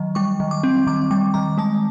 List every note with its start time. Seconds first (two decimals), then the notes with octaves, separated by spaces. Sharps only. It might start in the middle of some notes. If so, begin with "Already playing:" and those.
Already playing: D#3 F#3
0.15 G3 C#6
0.40 D#3
0.51 D6
0.63 C4
0.87 D#3 D6
1.11 G3 D6
1.34 D#3 A#5
1.58 G#3 A5